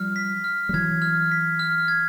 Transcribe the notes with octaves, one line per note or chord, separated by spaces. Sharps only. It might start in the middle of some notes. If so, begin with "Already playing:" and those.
Already playing: F3 G3 F6
B6
F6
G3
E3 F#3 G#6
F6
B6
F6
G#6